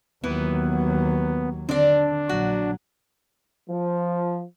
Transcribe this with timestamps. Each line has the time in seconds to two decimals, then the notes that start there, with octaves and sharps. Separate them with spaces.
0.24 D#2 E3 F#3 B3
1.69 D3 C4 D4 D5
2.29 A#1 F#3 F#4
3.70 F3